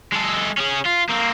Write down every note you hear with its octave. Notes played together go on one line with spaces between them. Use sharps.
G#3 A4
C#4 G#4
F4
A#3 C4